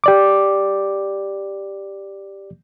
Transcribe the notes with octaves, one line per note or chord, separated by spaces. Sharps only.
G4 D5 D6